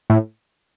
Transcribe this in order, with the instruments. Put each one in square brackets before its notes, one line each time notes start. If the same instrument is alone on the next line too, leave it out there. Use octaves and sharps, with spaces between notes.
[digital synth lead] A2